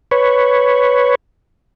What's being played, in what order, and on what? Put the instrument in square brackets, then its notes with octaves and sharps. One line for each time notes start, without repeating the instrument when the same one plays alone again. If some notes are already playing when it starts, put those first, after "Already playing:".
[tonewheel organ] B4 C#5